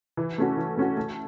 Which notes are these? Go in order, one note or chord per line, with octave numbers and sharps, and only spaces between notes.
E3
A3 C#4 F#4
E3
A3 C#4 F#4
A3